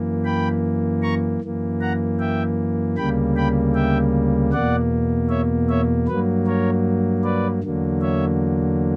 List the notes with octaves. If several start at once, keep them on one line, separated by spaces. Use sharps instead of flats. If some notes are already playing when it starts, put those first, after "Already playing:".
Already playing: F#2 E3 A#3
G5 B5
A#5 C#6
F#2 E3 A#3
F#5 A#5
E5 G5
D2 C#3 G3 A#3 G5 B5
G5 B5
E5 G5
E2 B2 A#3 D5 F#5
C#5 E5
C#5 E5
G2 F#3 A#3 B4
A#4 C#5
B4 D5
E2 D3 F#3 A#3
C#5 E5